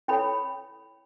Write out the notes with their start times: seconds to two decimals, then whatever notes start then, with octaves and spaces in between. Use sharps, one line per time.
0.08 E4 A4 C#5 G5 B5